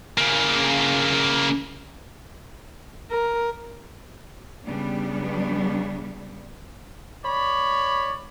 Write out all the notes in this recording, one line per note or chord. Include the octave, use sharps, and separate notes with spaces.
C#3 A#3
A#4
C#3 G3 B3 D4
C#5 D5 B5